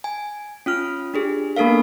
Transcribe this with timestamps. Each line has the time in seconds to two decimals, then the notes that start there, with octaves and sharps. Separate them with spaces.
0.04 G#5
0.66 C#4 F4 F6
1.14 D4 G4 G#4
1.56 A#3 B3 D4 A4 A#4 F5